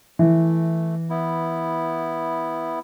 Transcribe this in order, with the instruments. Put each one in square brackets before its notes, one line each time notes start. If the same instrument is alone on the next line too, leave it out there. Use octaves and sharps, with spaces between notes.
[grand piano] E3 [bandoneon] A3
[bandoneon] B3 E4